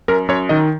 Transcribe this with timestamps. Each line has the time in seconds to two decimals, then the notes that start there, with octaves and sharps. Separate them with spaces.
0.08 F#2 A#4
0.29 F#2 C#5
0.49 D#3 D#5